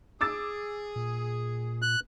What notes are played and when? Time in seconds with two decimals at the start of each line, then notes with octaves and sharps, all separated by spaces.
0.21 G#4 D6 E6 A6
0.96 A#2
1.82 F#6